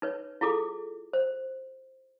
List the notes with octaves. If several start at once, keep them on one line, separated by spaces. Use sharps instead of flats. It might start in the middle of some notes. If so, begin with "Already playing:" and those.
D#4 B4 C#5
E4 F4 G#4 A4 D6
C5